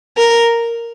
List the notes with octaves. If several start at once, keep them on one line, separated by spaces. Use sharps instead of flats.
A#4